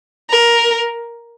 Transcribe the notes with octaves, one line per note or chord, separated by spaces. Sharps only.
A#4